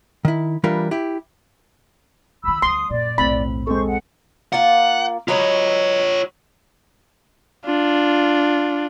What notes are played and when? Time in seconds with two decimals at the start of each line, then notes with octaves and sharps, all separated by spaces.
0.25 D#3 E4
0.64 E3 G3 D4 F4 A#4 B4
0.91 E4 G4
2.44 D2 D#3 B5 E6
2.62 D2 G3 C6 D#6
2.90 F#2 A#2 D5
3.18 B1 E2 A2 C4 B5
3.67 G#3 C4 A4 C5 C#6
3.87 F#5
4.53 A#3 F4 F5 F#5
5.28 F#3 F4 B4 C#5 D#5
7.65 D4 F4